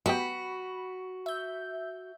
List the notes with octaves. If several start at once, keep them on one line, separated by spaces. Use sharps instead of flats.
F#3 B3 F#4 G4 B5
E5 G6